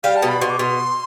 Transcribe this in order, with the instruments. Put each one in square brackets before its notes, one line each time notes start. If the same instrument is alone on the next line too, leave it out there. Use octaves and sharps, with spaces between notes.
[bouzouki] G3 [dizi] F5
[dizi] A5
[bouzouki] B2
[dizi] B5
[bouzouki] B2 [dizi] C6
[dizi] D6
[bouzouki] B2 [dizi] C6